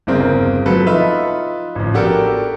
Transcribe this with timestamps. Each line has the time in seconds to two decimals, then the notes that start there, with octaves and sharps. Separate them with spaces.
0.07 G1 E2 C#3 C4 A#4
0.66 F3 F#3 F#4 A4 B4
0.86 D#4 F4 B4 E5
1.75 A1 F3
1.93 B3 D4 F#4 G4 A4 A#4